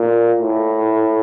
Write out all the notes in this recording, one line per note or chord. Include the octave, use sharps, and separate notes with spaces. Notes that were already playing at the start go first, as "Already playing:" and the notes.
Already playing: A#2
A2